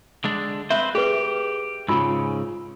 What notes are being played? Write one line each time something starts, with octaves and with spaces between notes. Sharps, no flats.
D3 G#3 D4
C4 B4 C5 E5
G4 G#4 B4
G#2 C#3 F4 B5 E6